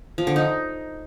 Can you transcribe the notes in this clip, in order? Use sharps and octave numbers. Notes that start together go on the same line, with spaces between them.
F3
D3
D#4